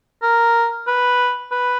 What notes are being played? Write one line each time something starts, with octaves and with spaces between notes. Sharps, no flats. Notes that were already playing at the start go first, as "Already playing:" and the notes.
A#4
B4
B4